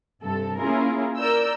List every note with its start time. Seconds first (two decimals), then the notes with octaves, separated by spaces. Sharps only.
0.24 G2 C3 A4
0.58 A#3 C#4 E4 F4 G#4 A#4
1.18 A#4 D5 E6 G6